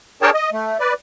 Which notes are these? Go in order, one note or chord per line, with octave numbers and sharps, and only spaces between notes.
D4 G#4 A#4 C#5 G5 A5
D#5
A3
B4 D5